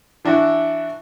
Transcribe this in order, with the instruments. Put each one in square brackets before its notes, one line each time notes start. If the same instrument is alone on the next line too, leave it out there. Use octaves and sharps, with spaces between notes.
[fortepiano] E3 D4 E4 F#4